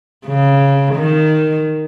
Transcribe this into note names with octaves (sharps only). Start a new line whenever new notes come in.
C#3
D#3